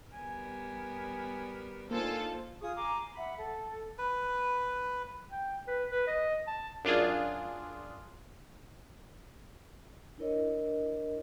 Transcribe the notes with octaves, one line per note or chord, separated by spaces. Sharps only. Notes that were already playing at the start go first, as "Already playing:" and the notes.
G3 B3 A#4 G#5
A#3 D4 D#4 F4 A4 C5 G#5 A5
F4 G#4 C#6 D#6
G#5 A#5 C6 D6
C6
E5 F#5 B5
A4
B4
G5
B4
B4
D#5
A5
F#2 D4 F4 G#4
D4 E4 A#4 C#5 D#5